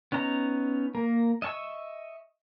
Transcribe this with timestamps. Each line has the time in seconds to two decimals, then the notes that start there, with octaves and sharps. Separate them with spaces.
0.12 B3 C#4 D#4 A#5
0.95 A#3 A#4
1.42 D#5 E5 G#5 C#6 E6